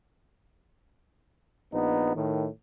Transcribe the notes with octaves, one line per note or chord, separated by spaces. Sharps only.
A#1 B3 D#4
A2 D#3